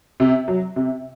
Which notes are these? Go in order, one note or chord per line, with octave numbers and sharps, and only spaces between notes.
C3
F#3
C3